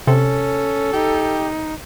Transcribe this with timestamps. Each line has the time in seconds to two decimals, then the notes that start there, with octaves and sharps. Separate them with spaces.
0.07 C3 C#4 A4
0.93 D#4 G4